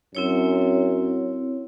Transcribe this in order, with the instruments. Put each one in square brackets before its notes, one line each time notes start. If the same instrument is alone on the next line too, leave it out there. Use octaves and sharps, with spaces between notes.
[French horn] F#2 [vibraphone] C4 E4 C#5